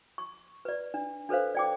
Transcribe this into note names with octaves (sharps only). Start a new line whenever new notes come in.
C#6
B4 D5
D4
D4 A4 B4 C5 F5
D5 G5 D6